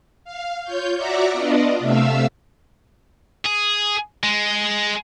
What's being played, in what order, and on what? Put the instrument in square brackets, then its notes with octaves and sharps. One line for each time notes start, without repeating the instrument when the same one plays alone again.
[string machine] F5
F4 C#5 G6
F#4 D5 E5 F#5 A#5 D6
B3 D4 F4 D5 D#5
C3 A3 E5 F5 E6
[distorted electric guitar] G#4
G#3